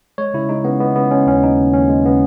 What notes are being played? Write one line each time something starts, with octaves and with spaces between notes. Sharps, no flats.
G#3 C#5
C#3 E4
G#3 D#4
C#3 B3
G#3 B3
C#3 B3
G#3 C#4
D#2 C#4
D#2 D#4
C#3
D#2 C#4
G#3
C#3 B3